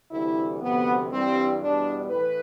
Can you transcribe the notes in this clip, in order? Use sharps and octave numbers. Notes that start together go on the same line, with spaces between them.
D2 C3 E3 G3 E4
D2 C3 F3 B3
G2 E3 G3 C4
E2 B2 G3 D4
A2 E3 B4